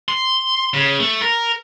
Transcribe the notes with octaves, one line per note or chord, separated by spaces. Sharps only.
C6
C#3
A3
A#4